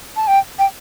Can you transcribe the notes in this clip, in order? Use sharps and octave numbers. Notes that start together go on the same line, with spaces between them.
A5
G5
G5